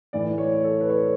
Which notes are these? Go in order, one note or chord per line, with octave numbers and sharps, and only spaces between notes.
A2 E3 D5
C#5
A4
B4
C#5